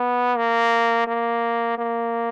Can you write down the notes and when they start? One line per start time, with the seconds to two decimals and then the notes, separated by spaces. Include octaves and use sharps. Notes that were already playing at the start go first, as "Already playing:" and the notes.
Already playing: B3
0.37 A#3
1.07 A#3
1.78 A#3